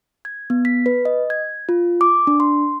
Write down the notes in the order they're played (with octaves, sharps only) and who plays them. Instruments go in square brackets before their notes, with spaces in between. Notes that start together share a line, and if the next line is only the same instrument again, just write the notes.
[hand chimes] G#6
B3
B6
B4
D#5
G#6
F4
D6
D4
C6